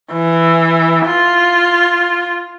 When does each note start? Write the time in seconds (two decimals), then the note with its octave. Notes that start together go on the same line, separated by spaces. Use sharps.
0.12 E3
1.06 F4